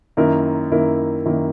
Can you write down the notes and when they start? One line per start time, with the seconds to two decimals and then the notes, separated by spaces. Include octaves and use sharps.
0.17 F#2 D#3 A#3 E4 A#4
0.71 F#2 D#3 A#3 E4 A#4
1.25 F#2 D#3 A#3 E4 A#4